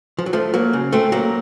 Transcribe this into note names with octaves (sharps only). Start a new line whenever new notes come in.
F3
F#3
F3 A3
F#3 A#3
C#3
A3 C4
F#3 A#3